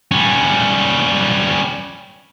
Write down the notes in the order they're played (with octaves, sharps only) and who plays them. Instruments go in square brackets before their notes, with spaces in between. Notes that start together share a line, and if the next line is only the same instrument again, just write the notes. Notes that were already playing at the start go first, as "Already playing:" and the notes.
[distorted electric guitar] G3 C#4